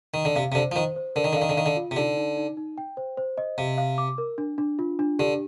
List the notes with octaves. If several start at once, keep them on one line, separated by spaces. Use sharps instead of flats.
D#3
D3
C3 F5
C3
D3 C5
F3
D#3 C5
C5
D3 A#4
D#3
D3
F5
D#3
D3
D#3 F5
D3
F4
C3
D3 D#4
D#4
D#4
D#4
G5
C5
C5
D#5
C3 F5
F5
D6
A#4
D4
D4
F4
D4
D3 G4